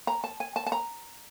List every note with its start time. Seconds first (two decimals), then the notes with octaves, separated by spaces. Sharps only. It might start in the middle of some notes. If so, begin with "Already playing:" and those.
0.07 A#5
0.24 A5
0.40 G#5
0.56 A5
0.66 A5
0.72 A#5